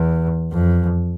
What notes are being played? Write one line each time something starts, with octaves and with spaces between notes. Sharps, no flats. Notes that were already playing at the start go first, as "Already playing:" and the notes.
Already playing: E2
F2